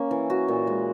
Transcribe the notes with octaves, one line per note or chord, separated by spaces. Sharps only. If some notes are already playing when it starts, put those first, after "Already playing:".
Already playing: A#3 C#4
E3
F#4
A#2
G#3